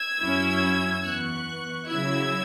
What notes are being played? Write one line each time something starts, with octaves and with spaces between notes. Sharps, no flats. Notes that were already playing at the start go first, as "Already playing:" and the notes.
Already playing: E6 G#6
F#2 F#3 C#4 E4
E2 E3 B3 C#6 F#6
C#3 F#3 E4 E6 G#6